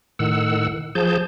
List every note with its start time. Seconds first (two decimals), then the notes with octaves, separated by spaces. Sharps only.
0.19 A2 D#3 F#5 E6
0.95 F3 G#4 A5 G6